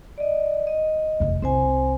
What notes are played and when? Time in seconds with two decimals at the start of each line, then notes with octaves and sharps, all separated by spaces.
0.18 D5 D#5
0.67 D#5
1.20 F1 E2
1.42 C2 C4 C5 G#5